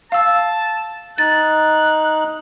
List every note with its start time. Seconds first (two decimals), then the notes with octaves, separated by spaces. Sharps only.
0.12 F5 A5 E6
1.18 D#4 F#6 A6